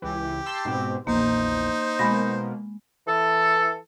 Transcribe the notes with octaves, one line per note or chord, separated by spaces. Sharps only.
C#2 E3 G4
A5 C6 E6
G#2 B2 C4
A#1 E2 A#3 D#4 C5
B2 G#3 A#3 B5 A#6
E3 A4